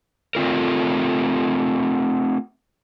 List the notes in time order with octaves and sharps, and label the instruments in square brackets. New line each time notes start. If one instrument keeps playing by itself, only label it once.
[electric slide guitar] A3 C4 F4 A#4